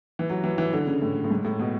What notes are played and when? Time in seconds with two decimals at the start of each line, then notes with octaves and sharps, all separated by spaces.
0.19 E3
0.30 F#3
0.44 E3
0.58 E3
0.73 D3
0.87 C#3
1.02 A2
1.24 A2
1.30 G#2
1.45 A2
1.59 B2